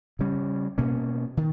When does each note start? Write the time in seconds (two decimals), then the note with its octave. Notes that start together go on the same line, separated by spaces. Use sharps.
0.19 C#3 G3 C#4
0.78 B2 A#3 C#4
1.37 D#3